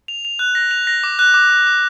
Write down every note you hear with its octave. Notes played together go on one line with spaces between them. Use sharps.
F7
F7
F#6
A#6
F7
A#6
D6
F#6
D6
D6
D6